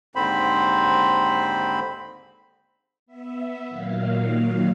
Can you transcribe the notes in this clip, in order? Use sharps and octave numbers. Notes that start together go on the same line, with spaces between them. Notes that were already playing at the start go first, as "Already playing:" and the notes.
D#2 G#2 D3 C4 C5 B5
B3 E5
A#2 D#3 F#3 A#3 F5